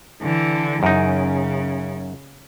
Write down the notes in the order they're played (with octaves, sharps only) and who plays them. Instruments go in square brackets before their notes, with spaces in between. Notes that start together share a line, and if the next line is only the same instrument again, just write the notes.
[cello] D3 E3
[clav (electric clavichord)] F#2 D#4 [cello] C#3